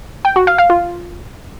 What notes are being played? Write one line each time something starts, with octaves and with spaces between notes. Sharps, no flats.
G5
F#4
F5
F5
F4